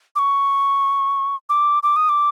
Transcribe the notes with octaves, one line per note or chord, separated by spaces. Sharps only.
D6
C#6
D6
D6
D#6
D6